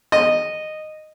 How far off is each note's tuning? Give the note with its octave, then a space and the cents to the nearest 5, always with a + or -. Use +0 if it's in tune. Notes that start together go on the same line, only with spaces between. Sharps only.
D#5 -10